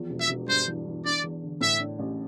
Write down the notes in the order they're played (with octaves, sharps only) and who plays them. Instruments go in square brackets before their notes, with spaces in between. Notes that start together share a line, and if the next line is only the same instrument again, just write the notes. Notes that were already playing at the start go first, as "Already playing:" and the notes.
Already playing: [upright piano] E2 F3
E1
[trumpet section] E5
[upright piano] E1
[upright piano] G2 [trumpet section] C5
[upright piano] E3
E3
[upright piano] D4 [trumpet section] D5
[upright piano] E2
D3
[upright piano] A2 [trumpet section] E5
[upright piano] D4
A1